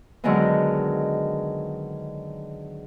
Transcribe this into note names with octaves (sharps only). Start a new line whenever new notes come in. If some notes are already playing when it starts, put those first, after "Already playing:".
D3 D#3 F#3 G#3 B3